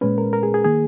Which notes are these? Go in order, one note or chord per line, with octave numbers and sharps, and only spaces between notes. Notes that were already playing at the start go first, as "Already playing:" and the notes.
A#2 G#3 C#4 B4
A#4
A#4
G#4
G#4
D#3 A#3 G#4